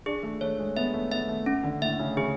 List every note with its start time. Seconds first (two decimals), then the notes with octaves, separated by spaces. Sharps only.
0.06 D4 G#4
0.23 A3
0.41 A3 C#5
0.59 G#3
0.77 B3 E5
0.94 A3
1.11 B3 E5
1.28 A3
1.46 C#4
1.64 D3
1.82 A2 E5
1.99 C#3
2.17 C#3 G#4